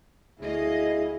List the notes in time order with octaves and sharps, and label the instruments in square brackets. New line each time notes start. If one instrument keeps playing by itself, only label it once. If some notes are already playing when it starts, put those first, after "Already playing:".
[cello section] D2 D#5 F5 [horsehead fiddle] E4 G#4